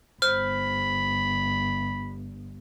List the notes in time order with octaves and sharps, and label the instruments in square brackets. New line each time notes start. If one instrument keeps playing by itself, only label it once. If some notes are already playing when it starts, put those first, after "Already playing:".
[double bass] G1 [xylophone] C5 F6 [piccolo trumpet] B5